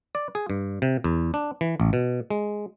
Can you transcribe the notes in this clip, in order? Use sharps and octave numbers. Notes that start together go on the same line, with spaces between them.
D5
G#4
G2
C3
E2
D4
E3
A1
B2
G#3